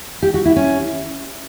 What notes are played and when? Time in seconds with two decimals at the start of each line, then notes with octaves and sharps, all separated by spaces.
0.23 G4
0.34 F#4
0.45 E4
0.56 C#4